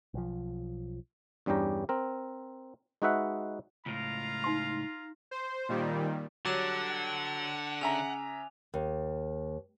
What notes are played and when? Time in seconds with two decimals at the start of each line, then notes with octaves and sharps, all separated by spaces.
0.14 B1 F3
1.46 E2 G2 G3 C#4 G4 A#5
1.89 C4 A#4
3.02 G#3 D#4 F#4 B4 E5 F#5
3.86 C#2 A2 F4 F5 A#5
4.44 D#4 C6
5.31 C5
5.69 A#2 D#3 G3
6.45 D3 F#3 G3 F#5 D6 F#6 E7
7.81 C#3 E5 G#5 A#5 F7
8.74 D#2